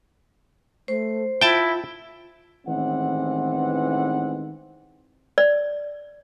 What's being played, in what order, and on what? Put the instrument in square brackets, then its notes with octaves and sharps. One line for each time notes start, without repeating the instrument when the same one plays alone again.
[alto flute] A3 [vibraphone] C5
[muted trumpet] E4 [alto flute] F4 [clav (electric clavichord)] G5 A5
[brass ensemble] A1 D#3 E3 G#3 C4 F#5
[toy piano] D5